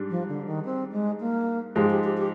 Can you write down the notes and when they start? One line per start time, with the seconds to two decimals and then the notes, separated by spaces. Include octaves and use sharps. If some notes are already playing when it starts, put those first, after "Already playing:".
Already playing: G#2 G3 D4
0.10 F3
0.28 D3
0.47 D#3
0.65 C4
0.92 G#3
1.20 A#3
1.75 G#2 F3 G#3 G4
1.90 G4
2.04 G4
2.17 G4